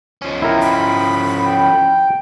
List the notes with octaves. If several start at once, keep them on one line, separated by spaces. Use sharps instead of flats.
F3 C#4
E4 A#4 G5
B5
G5